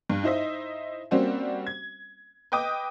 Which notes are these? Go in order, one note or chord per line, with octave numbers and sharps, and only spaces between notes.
G2
D#4 E4 C5 D#5 E5
G3 A#3 C4 C#4 F#4 C5
G#6
B4 D#5 G5 D6 D#6